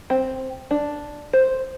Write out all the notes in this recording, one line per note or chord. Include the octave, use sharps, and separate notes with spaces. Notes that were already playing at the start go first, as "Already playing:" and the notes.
C4
D4
C5